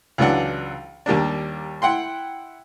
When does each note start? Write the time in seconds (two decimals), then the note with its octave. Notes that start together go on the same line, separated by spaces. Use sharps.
0.18 C#2 E3 F#3 D4 F#5
1.06 D#2 G3 A#3 D4
1.82 E4 F#5 G5 C6